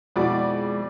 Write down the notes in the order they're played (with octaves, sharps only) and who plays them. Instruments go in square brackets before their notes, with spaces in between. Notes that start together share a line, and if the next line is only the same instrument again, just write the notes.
[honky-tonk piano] F2 D5 D6 [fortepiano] B2 [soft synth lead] G#3 [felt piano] E4 F#4